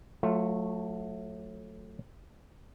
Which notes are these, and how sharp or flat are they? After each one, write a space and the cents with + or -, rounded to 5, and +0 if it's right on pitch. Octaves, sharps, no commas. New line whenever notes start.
F#3 -30 A3 +0 F4 +0